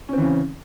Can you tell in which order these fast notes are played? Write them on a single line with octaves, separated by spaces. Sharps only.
C#4 C4 E3 C#3